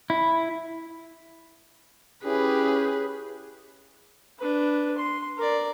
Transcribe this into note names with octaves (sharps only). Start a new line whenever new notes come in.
E4
C#4 E4 G4 G#4 B4
D4 B4
C6
A#4 D5